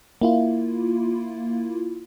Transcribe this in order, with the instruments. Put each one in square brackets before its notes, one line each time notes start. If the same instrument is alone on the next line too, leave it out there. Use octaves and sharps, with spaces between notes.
[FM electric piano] A#3 E4 F4